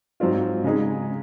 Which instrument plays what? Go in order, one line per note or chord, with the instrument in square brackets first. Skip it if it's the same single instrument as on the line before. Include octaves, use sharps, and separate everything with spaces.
[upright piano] G#2 F#3 C4 F4
C#3 G#3 D#4 G#4